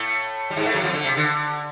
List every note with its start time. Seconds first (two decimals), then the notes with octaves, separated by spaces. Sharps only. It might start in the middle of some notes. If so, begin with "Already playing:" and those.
Already playing: A2 A3
0.50 G3
0.56 G#2 G#3
0.65 A2 A3
0.74 F#2 F#3
0.83 F2 F3
0.93 D3
1.04 C3
1.16 D3